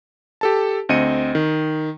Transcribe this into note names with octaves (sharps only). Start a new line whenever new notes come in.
G4 A4 A5
D2 C4 D#5 C#7 D#7
D#3